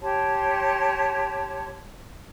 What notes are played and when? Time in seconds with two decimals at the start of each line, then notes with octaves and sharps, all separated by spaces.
0.02 G4 C#5 A5 C6